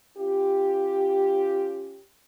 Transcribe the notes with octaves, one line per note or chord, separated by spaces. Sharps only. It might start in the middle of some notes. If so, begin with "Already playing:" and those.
C#4 F4 G4